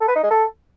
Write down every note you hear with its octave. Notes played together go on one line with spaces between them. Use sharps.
A4
B4
D#4
G#3
A4